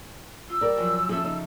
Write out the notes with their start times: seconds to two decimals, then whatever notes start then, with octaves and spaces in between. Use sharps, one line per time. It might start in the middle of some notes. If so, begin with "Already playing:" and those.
0.50 F4 E6
0.61 G3 A#4 D5
0.77 F#2 F3
1.09 F3 C#4 G#4 A4 E5
1.24 C#3 D#4